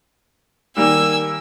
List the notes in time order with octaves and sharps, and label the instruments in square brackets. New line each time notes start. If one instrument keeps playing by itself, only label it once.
[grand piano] D#3 G3 A#3 [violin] G#5 E6